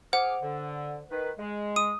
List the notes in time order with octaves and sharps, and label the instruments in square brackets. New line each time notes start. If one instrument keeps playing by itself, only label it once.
[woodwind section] G#4 D6 F6 [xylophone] C5 F#5
[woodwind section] D3
D#3 B4
G#3
[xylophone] D#6 D#7